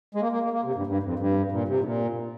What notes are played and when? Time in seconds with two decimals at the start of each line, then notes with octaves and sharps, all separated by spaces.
0.15 G#3
0.21 A#3
0.32 A#3
0.43 A#3
0.53 A#3
0.64 C3
0.75 G2
0.87 G2
1.03 F2
1.19 G2
1.52 A#2
1.68 C3
1.80 G#2
1.84 A#2